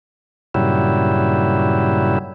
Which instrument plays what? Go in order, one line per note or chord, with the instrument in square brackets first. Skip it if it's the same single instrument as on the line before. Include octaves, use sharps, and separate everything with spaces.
[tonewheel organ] G2 A#2 C#3 F#3 G3 E4